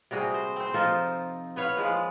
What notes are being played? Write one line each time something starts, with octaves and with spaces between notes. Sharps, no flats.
C3 G3 F#4 G#4
C5
C4 C5
F3 D#4 F4 A4
B3 B4 C#5 F5
F3 G#3 B4